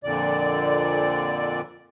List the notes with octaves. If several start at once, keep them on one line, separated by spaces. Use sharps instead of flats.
F2 A#2 D3 D5